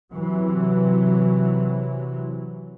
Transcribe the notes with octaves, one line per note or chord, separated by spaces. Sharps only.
C3 E3 F#3